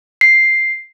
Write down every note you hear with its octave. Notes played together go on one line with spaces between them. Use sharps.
C7